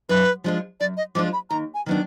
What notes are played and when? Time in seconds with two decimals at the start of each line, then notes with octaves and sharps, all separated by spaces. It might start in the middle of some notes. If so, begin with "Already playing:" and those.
0.09 F#2 B4
0.44 F3 G#3 D4 F4
0.80 F#2 D5
0.97 D#5
1.15 F3 G#3 D4 F4 D6
1.33 B5
1.50 D#2 A#5
1.74 G#5
1.86 D#3 F#3 B3 D4